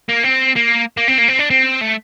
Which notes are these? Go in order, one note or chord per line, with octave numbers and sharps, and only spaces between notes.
A#3
C4
A#3
A#3
C4
A#3
C4
D4
C4
A3